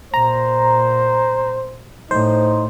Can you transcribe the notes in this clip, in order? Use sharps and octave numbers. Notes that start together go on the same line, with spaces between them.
A#2 C5 A#5
A2 D#4 C5